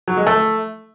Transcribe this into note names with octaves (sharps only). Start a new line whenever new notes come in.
F#3
G#3
A3